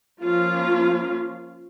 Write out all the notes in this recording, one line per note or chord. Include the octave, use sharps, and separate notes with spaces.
F3 A#3 C#4 F4